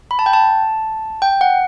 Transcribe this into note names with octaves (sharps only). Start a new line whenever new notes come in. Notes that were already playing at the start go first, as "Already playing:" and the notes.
B5
A5
G5
A5
G5
F#5